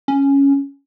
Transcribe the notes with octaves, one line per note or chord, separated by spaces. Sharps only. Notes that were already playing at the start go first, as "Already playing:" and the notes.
C#4